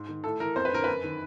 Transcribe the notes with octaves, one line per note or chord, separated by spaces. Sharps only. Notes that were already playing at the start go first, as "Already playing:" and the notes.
Already playing: G#2
D#3
A2 A4
E3 A#4
F2 C5
B4
D3 A#4
F#2 B4
D#3